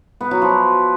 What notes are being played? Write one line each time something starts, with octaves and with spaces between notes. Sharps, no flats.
B3
F#3
F3